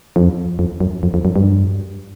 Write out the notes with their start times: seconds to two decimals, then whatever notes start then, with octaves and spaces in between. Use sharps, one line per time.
0.16 F2
0.59 F2
0.80 F#2
1.03 F2
1.14 F2
1.25 F#2
1.36 G2